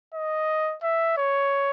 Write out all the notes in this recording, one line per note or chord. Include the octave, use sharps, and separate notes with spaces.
D#5
E5
C#5